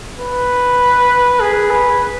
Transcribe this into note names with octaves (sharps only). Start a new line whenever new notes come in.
B4
G#4
B4